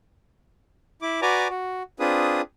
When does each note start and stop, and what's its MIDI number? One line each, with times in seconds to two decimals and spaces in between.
1.02 1.20 64
1.02 1.20 86
1.22 1.48 66
1.22 1.48 71
1.22 1.48 74
1.22 1.48 80
1.22 1.48 82
1.22 1.48 86
1.49 1.83 66
2.00 2.42 60
2.00 2.42 62
2.00 2.42 65
2.00 2.42 68
2.00 2.42 71
2.00 2.42 87